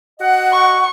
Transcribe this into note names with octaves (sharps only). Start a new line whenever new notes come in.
F#4 D#5 F#5
C#6